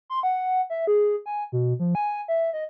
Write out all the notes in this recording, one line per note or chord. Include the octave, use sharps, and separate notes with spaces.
C6
F#5
E5
G#4
G#5
B2
F3
G#5
E5
D#5